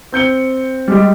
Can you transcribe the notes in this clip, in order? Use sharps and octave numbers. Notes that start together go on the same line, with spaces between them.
C4 G6 C#7 G7
G3 G#3 G4